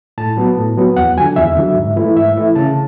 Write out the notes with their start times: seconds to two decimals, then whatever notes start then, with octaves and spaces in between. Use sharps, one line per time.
0.18 A2 A5
0.37 F#3 B3
0.57 A2
0.78 F#3 B3
0.97 E2 F#5
1.17 D3 F#3 G#5
1.36 E2 E5
1.57 D3 F#3
1.77 G#2
1.96 E3 A3 E4
2.17 G#2 E5
2.36 E3 A3 E4
2.56 C#3 A5